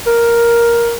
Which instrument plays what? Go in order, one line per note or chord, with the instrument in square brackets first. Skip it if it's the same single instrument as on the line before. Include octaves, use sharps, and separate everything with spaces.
[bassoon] A#4